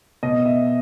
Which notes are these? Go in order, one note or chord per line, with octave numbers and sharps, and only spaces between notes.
B2 D#5
E5